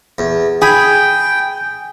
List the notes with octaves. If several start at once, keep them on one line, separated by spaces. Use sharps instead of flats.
E2
G#4 G5 B5